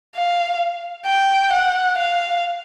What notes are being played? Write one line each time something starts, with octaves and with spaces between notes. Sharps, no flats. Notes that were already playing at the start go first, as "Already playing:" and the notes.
F5
G5
F#5
F5